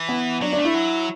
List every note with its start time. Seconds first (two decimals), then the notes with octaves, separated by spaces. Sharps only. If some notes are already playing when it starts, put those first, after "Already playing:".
Already playing: E3
0.09 B3
0.42 F#3 D4
0.53 D4
0.59 A3
0.65 E4
0.74 F#3